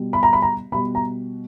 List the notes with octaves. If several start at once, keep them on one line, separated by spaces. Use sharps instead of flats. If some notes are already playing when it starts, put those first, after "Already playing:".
Already playing: B2 G3
B5
A#5
B5
A#5
B2 G3 B5
A#5